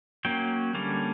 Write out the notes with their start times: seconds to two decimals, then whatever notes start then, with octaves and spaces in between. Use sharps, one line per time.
0.25 F#3 A#3 C#4 G5
0.75 D3 G3 A#3 C#4